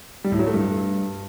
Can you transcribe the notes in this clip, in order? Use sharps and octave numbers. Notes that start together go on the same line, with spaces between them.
G3
A2
F#3
A3
G2